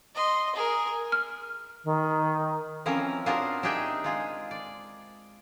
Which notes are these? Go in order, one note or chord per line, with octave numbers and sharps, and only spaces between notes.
D#5 C6
G#4 A#4
F6
D#3
E3 F3 C4 C#4 A#4
D4 F4 F#4 G#4 A#4 C5
D4 D#4 G4 G#4 E5 G5
G#3 F4 G#4
D5